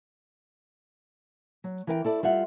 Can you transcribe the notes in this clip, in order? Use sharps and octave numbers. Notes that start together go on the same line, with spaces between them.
F#3
E3 A#4 G5
E4 A4 D5
G3 F4 E5 F#5